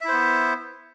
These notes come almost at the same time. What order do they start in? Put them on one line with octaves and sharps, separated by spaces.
E5 E4 C5 B3